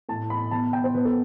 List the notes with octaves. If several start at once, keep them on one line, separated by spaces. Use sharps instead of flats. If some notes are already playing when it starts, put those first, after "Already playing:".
A2 A5
A2 B5
B2 A5
B2 G5
C5
B2 B4
A4